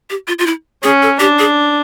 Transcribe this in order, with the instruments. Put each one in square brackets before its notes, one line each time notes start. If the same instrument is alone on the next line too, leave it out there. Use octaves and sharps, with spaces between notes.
[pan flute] G4
F4
F4
E4
[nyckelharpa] C#4 [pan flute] G#4
[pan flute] A4
[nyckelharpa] D4 [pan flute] G4
[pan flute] G#4